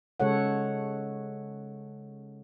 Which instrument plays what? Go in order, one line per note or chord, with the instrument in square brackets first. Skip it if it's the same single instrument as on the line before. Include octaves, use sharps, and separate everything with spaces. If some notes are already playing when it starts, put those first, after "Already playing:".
[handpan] C#3 G#3 A4 C#5 F#5